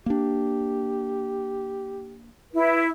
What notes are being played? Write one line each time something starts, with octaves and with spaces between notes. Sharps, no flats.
A#3 D4 G4
E4 B4